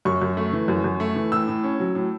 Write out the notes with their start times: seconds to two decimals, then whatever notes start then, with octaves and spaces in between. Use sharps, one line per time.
0.05 F#2 C#6
0.22 F#2
0.37 A3
0.53 E3
0.68 F#2
0.84 F#2
1.00 A3
1.16 E3
1.32 A2 E6
1.48 A2
1.63 C#4
1.80 F#3
1.95 A2